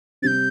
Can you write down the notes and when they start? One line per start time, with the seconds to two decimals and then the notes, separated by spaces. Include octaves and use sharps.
0.22 C3 G3 C4 G6 A6